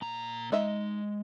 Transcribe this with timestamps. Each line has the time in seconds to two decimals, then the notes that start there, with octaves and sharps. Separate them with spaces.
0.02 A#2 A#5
0.52 G#3 D#4 D#5 E5